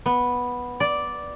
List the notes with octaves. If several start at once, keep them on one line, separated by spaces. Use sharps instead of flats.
B3
D5